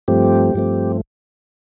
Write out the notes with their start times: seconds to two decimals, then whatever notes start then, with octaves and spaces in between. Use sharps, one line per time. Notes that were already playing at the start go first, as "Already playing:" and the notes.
0.08 G2 F3 A3 C4 G4
0.54 G2 F3 A3 C4